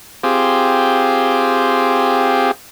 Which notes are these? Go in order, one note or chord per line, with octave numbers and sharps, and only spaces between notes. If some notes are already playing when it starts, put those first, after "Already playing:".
C4 F4 G4 G#4